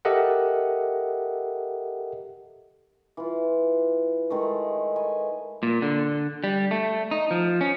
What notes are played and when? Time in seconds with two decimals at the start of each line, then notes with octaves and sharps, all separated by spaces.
0.05 G4 A4 A#4 D#5 E5 F#5
3.17 E3 F4
4.30 D#3 G#3 A3
4.96 B4 G#5
5.63 A#2
5.82 D3
6.44 G3
6.71 A3
7.11 D#4
7.31 F3
7.61 C#4